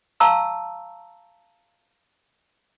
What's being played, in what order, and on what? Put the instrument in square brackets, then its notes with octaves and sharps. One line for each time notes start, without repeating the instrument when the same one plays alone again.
[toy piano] F5 A5 A#5 C#6 E6